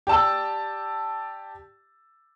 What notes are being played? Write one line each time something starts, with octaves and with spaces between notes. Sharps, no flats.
G4 D5 A5 E6